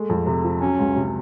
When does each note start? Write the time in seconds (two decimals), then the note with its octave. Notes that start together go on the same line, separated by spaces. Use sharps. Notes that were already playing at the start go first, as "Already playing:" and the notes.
Already playing: G#3 A3
0.09 F2
0.26 C3
0.44 F3
0.61 F#3 C#4
0.79 C#2
0.96 C3